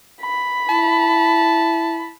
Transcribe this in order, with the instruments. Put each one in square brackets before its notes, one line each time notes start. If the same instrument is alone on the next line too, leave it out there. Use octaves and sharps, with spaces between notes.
[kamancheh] B5
[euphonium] E4 [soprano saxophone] A5